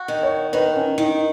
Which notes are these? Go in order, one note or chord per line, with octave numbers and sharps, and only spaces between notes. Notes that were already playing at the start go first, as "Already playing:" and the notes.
Already playing: F#4
D#3
C#5
D#3 B4
C#4
D#3 D#4